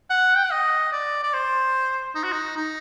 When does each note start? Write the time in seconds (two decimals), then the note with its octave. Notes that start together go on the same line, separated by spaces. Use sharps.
0.10 F#5
0.37 G5
0.45 F#5
0.51 D#5
0.92 D5
1.23 D5
1.34 C5
2.15 D#4
2.24 F#4
2.32 D#4
2.56 D#4